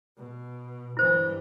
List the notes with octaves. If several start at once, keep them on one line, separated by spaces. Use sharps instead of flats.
B2
G2 E3 E4 C5